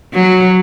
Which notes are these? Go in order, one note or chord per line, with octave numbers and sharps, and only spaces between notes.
F#3